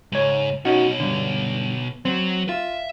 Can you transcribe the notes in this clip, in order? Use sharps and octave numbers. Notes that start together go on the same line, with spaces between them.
C#2 G#2 C#5
B2 C#4 D#4 F#4 C#5
G2 D3
F#3 C4
F4 E5